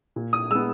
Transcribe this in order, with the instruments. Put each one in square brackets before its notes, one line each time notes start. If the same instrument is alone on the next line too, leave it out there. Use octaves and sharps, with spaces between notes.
[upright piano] A#2
D#6
G#3 B3 E6